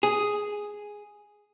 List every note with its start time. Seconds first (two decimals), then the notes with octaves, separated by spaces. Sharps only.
0.03 G#4